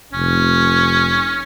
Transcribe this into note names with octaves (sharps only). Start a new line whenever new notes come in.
F1 C#4